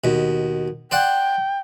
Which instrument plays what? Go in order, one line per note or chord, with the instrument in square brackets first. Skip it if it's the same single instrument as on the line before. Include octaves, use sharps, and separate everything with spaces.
[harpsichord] D#2 B2
[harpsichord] C5 D5 F#5 [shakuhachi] G5